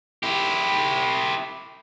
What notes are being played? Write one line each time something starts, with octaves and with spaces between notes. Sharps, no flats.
E4 G4